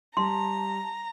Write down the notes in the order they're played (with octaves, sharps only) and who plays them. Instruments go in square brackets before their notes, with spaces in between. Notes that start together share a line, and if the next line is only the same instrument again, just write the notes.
[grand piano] G3 [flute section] A5 [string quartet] A#5 [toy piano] C6